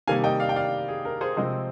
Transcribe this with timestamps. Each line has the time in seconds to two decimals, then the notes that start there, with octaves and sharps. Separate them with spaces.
0.07 C3 D#3 G3 A#3 F5 G#5
0.24 D#5 G5
0.40 D5 F5
0.49 G5
0.56 D5 F5
0.88 G#4
1.05 A#4
1.21 G#4 C5
1.37 C3 F3 G#3 C4 C5 D#5